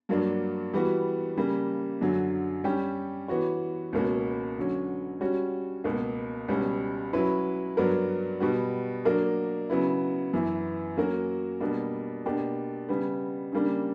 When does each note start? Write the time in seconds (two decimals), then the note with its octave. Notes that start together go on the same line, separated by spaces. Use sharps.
0.09 G2 F#3 A#3 D4
0.73 E3 G3 B3 F#4
1.37 C#3 G3 A#3
2.01 F#2 D3 F#3
2.64 G3 C#4 G4
3.28 E3 B3 F#4 C#5
3.93 C#2 B2 A#3 C#4 F#4
4.57 D3 F#3 C#4
5.21 G3 C#4 F#4 C#5
5.84 C#2 B2 A#3
6.48 C#2 B2 G3 C#4
7.13 F#3 C#4 E4 B4
7.77 G2 F#3 B3 D4 A#4
8.40 B2 G3 B3 F#4
9.05 F#3 A#3 D4 A#4
9.70 C#3 F#3 B3 E4
10.33 F#2 E3 B3 E4
10.96 F#3 A#3 C#4 F#4 A#4
11.60 B2 G3 A#3 D4
12.26 B2 A#3 D4 G4
12.89 C#3 G3 B3
13.52 C#3 G3 A#3 D4